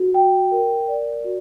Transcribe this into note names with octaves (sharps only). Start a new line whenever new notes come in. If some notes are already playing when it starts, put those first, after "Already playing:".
Already playing: F#4
G5
A#4
D5
F#4